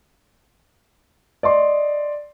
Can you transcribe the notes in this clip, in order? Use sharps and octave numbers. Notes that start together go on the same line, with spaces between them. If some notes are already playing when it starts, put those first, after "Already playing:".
D5 D#5 C6